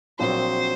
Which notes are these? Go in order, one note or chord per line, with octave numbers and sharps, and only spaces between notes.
A#1 A#2 F#3 C4 C5